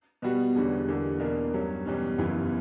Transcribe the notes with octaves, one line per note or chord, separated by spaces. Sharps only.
B2 G3 B3 F#4
E1 E2 D3 G3 C#4
E2 D3 A#3
E2 B2 A#3 D4 A#4
G2 F#3 C#4
E2 B2 G3 C#4
F#1 F#2 E3 B3